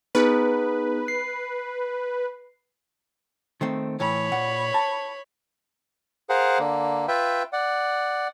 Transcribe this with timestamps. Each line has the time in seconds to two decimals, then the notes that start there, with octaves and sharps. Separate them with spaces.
0.15 B3 D#4 G#4 B4
1.08 C7
3.61 D#3 A3 C4
4.00 A2 E3 C#5 B5
4.32 A#2 F#5
4.74 A5
6.30 G#4 A#4 C5 F5 F#5
6.59 D3 A#3
7.08 F4 B4 E5 G5
7.53 D5 F#5